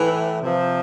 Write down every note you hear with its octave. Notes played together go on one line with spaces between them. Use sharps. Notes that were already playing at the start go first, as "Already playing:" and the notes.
Already playing: A2 E3
C3 F3